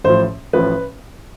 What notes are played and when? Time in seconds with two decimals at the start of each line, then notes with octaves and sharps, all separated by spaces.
0.04 A1 A2 F3 C5
0.53 A1 A2 F3 B4